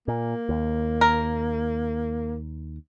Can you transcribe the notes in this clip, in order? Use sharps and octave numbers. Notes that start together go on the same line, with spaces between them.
A#2 A#3
D#2
A#4